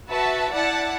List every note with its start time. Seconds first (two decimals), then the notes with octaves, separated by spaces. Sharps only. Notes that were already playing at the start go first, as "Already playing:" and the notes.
0.08 F#4 B4 E5 A5
0.51 E4 D5 F#5 A5